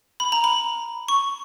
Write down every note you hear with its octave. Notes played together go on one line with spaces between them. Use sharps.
B5
A#5
B5
C#6